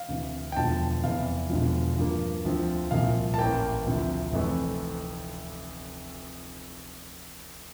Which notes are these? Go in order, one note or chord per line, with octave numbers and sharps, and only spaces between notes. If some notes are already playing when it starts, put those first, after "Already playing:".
Already playing: F5
D2 C3 E3
G5
E1 E2 D3 F3 A5
F1 E2 C3 E3 F5
E1 E2 D3 F3
G2 F3 A#3
D2 D3 F3 C4
C2 A#2 F3 F5
A5
A1 A2 E3 A#3 G5
D2 C3 F3
F1 F2 E3 A3 C4